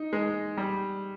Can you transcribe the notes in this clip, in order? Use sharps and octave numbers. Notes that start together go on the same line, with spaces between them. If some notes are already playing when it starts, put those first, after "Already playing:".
Already playing: D#4
G#3
G3